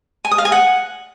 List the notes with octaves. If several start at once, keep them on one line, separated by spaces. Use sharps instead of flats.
G#5
D#6
F5
G#5
F#5